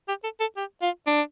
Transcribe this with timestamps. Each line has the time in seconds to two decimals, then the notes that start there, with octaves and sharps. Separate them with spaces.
0.08 G4
0.24 A4
0.40 A4
0.57 G4
0.82 F4
1.07 D4